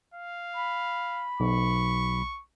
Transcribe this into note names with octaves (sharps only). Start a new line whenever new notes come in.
F5
B5
B1 C#6